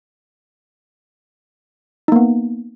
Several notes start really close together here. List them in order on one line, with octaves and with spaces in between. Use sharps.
D#4 A#3 B3